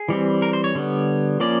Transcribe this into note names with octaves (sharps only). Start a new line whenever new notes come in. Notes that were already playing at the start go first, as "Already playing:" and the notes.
Already playing: G#4
E3 G3 C4
A#4
C5
C#5
D3 G3 B3
F3 A#3 C#4 D5